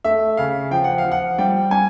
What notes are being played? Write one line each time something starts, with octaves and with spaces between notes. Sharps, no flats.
A3 E5
C#3 F5
F3 G5
F#5
F5
F3
F#5
G3 G5
G3 G#5